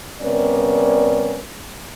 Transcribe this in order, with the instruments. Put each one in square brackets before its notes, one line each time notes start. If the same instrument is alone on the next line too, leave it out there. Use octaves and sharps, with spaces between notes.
[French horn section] C3 G3 B3 C#4 A#4 D5